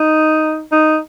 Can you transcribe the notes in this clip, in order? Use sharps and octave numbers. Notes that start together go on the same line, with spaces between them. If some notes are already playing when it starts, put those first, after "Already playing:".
Already playing: D#4
D#4